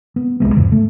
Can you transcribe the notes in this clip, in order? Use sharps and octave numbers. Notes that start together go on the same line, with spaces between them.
B3
B1 E2 G#3 B3
E2 G#2 C#3
A3